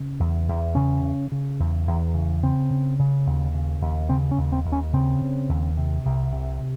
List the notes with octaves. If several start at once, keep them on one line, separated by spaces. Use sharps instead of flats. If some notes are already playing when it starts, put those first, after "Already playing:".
Already playing: C#3
E2
E2
C#3 C#4
C#3
C#3
E2
E2
C#3
C#3 C4
C#3
C#3
D#2
C#3
D#2
C#3 C4
C#4
D#2
C4
D#2
C#4
C#3 C4
C#3
D#2
C3
C2
C3